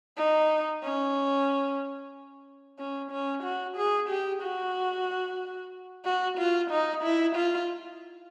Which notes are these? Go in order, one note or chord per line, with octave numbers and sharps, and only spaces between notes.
D#4
C#4
C#4
C#4
F#4
G#4
G4
F#4
F#4
F4
D#4
E4
F4